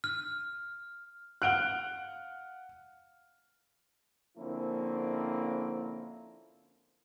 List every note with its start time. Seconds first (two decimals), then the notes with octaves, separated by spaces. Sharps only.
0.04 F6
1.42 F5 F#5 F6 F#6 D7 G7
4.37 D3 F3 A#3 C4 C#4 E4